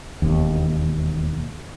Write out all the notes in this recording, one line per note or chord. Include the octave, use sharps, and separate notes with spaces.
E1 D#2